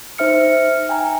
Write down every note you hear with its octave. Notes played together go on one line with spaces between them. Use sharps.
D#4 C5 E5 F6 C#7
G5 G#5 A#5